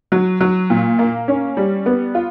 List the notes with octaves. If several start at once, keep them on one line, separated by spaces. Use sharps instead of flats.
F#3
F#3
A#2
A#3
C#4
G3
B3
F4